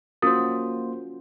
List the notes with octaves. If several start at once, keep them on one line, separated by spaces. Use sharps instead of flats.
A#3 C#4 F4 F#4 C5 D#6